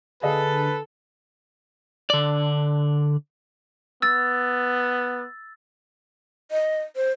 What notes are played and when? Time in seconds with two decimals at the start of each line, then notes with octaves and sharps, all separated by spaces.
0.23 D3 G#4 A4 B4 D#5 F5
2.10 D3 D5
4.02 B3 E6 A6
6.51 D#5
6.96 C5